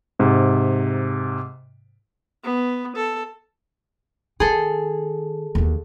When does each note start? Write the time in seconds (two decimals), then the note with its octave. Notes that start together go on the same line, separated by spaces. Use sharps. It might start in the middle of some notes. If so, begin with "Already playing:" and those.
0.19 G#2 C3
2.43 B3
2.95 A4
4.40 D#3 G#4 A4
5.55 D#2 E3